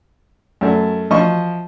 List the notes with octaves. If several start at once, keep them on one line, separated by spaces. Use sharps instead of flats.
F#2 A3
F3 D#5 E5 C#6